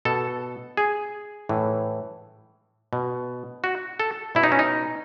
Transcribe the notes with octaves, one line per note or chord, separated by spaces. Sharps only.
B2 A4
G#4
A2 E3
B2
F#4
A4
B2 E4
D#4
C#4
D#4